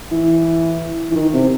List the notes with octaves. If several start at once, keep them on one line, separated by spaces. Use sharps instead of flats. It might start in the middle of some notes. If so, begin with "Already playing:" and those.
E3
E3
D#3
C3